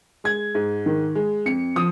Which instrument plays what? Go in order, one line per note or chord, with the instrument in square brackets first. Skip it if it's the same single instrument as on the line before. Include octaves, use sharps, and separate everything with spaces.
[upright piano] G#3 G#6
G#2
D#3
G#3
F2 C#7
F3 D#6